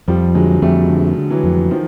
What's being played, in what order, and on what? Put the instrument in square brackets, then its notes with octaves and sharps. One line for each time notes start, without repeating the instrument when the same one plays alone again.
[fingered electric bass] F2 [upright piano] F3 G3
[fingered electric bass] D3 [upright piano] F#3 G#3
[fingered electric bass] F2 [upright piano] G3 A3
[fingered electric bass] D3
D3
[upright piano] E3 F#3
[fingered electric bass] F2
[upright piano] D#3 F3